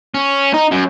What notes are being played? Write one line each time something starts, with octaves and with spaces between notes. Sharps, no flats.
C#4
D#4
F#2